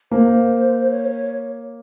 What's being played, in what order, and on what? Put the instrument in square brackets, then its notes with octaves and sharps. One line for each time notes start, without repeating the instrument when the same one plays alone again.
[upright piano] A#3 [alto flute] C5
[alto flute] C#5